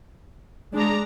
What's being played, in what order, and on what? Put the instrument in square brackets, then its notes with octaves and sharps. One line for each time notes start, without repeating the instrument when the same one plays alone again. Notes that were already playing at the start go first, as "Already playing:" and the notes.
[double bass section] G#3 [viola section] D4 A#5